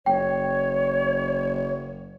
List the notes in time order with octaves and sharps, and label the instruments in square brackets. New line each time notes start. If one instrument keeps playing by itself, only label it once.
[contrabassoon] F#1 [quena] C#5 [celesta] G5